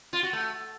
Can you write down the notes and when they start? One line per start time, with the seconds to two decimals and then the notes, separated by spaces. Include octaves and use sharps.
0.13 F4
0.23 F#4
0.33 A3